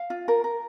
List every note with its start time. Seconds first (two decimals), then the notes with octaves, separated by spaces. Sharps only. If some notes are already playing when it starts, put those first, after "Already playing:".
Already playing: F5
0.10 F4
0.28 A#4
0.44 A#4